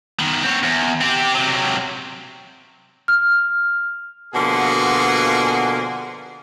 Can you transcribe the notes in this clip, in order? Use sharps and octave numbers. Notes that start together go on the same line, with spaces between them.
D#3 B3
C4 C#5
E2
C4 G4
C3 F#3
F6
B2 D3 F3 A#3 F#4 G#4